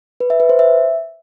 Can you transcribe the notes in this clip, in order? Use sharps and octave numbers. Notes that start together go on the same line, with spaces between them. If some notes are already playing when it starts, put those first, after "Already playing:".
B4
E5
B4
C5
E5